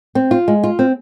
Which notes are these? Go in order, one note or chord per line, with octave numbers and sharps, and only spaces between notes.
C4
F4
G#3
F4
C4